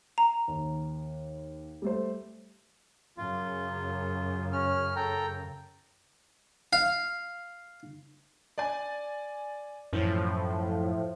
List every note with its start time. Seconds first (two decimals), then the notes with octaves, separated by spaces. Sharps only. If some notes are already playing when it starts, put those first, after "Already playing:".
0.18 A#5
0.48 D#2
1.82 G3 A3 C5
3.17 F#2 C#3 F4
4.52 C#4 F6
4.96 A4 G5 A#5
6.73 F5
8.58 D5 G#5
9.93 F#2 A2 E3 F3 C#4